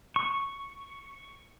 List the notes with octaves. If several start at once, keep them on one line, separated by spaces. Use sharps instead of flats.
C#6